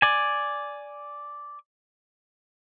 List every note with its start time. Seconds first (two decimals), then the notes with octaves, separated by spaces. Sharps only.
0.02 D5 G#5